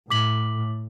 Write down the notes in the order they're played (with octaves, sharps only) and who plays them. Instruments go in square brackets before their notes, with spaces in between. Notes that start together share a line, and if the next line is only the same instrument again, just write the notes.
[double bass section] A2 [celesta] D6 B6 F#7